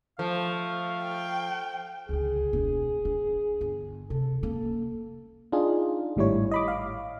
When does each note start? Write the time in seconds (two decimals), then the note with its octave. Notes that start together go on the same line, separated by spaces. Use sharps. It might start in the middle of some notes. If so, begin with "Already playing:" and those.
0.19 F3 A3 F5
1.03 G5
2.09 C#2 D3 G#4
2.53 E1
3.05 E3 D4
3.61 G1
4.10 C3 A4
4.43 A#3 C#4 A4
5.52 D4 D#4 F4 G#4
6.16 G#1 A2 G3 E4 C#5
6.52 D#5 B5 D6
6.68 F5